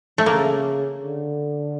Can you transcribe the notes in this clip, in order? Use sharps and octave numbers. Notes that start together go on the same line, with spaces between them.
A3
C#3 A#3
D3